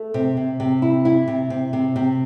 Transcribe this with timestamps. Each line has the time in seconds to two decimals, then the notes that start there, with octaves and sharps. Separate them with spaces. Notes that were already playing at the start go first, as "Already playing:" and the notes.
Already playing: A3
0.14 C3
0.37 C3
0.60 C3
0.82 E4
1.05 E4
1.28 C3
1.50 C3
1.73 C3
1.96 C3